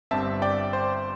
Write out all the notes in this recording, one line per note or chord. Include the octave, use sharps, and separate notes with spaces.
G1 G2 G3 C4 E5 A5
D5 G5
C5